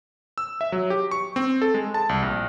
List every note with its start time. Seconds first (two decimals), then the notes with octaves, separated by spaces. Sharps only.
0.38 E6
0.61 E5
0.72 F#3
0.90 G4
1.11 C#6
1.36 C4
1.62 A4
1.74 G#3
1.94 A5
2.09 C2
2.22 A#1